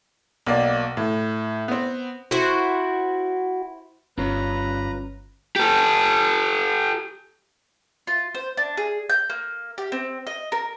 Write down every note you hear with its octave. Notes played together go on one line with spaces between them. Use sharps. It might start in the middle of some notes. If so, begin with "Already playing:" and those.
B1 A#3 D5
A2
B3 C4
E4 F#4 C5
G1 G2 C#4 F4 B4 C#5 A#5
G4 A4
F4
C5
D4
G#4
G6
A#3
G4
C4
D#5
A#4